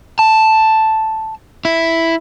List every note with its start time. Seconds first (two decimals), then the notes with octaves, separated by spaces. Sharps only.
0.19 A5
1.65 E4